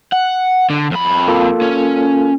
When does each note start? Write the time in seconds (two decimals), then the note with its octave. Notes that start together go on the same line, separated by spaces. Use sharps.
0.13 F#5
0.70 D3
0.91 F2 B5
1.28 A#3 F4 A4
1.61 C#4